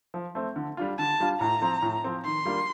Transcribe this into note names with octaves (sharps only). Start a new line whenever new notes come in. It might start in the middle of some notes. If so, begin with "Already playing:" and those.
F3
A3 C4
D3
G3 D4 F4
D3 A5
G3 D4 F4
A2 A#5
F3 C4
A2
F3 C4
D#3 C6
G3 A#3 D4 F4